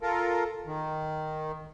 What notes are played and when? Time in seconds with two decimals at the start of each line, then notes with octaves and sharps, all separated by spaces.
0.01 F4 A4 A#4
0.66 D#3